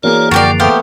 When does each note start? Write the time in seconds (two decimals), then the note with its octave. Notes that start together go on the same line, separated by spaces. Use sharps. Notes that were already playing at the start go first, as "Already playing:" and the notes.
0.03 E3 A#3 F#4 G#4 A#4 C#5 D5
0.31 F#2 D3 F3 F#4 G4 D5
0.60 A3 B3 G4 C5 F5